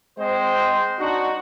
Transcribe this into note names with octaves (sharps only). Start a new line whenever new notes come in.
G#3 C4 C5
D4 D#4 F#4